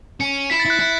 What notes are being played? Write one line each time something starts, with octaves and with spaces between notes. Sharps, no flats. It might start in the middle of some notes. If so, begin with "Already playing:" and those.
C#4 C#7
E4 B6
A6
E4 F#6
E4 F#6